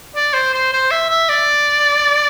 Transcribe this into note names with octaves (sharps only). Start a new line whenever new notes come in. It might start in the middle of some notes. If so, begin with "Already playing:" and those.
D5
C5
C5
C5
E5
E5
D5